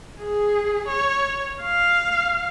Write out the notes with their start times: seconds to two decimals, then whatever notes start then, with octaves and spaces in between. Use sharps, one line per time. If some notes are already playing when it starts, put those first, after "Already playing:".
0.20 G#4
0.88 C#5
1.63 F5